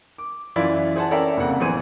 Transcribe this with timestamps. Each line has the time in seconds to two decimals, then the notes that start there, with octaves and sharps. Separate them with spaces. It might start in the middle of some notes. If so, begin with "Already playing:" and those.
0.18 D6
0.56 F#2 E3 E4 F4 D5
0.96 G#4 C5 F#5 A5
1.11 C#4 A4 A#4 D5 E5 G5
1.37 F1 F2 C#3 A#3 F#5
1.60 A1 E3 B3 G#4 C5 D#7